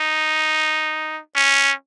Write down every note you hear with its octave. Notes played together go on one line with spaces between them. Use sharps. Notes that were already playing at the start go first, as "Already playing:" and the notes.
Already playing: D#4
C#4